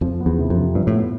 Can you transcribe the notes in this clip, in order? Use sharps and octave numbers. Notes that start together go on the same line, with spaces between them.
F2 F3
B3
E2
C3
F2
C3
G2 F3
A2
B3